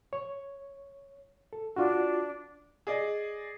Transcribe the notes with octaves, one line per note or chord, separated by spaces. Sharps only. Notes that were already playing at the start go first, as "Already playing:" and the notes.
C#5
A4
D4 F4 F#4
G#4 D5 D#5